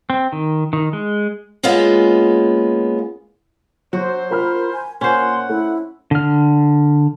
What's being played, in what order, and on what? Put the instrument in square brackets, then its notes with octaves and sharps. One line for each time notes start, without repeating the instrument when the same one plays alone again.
[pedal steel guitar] C4
D#3
D#3
G#3
[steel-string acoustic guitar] G#3 A#3 B3 C#4 F4
[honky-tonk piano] F#3 [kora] F#4 [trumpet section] C5
[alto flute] F4 [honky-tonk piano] A#4 B5 F6
[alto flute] G#5
[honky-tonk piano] A#2 [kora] C#4 C5 [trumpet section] F#5 [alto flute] C6
[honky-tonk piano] A3 [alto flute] E4
[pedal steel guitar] D3 F6